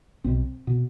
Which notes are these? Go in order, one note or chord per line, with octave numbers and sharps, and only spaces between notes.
B1 B2 C4
B2